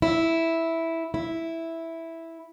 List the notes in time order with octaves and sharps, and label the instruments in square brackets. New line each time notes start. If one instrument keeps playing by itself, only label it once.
[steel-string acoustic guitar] E4
E4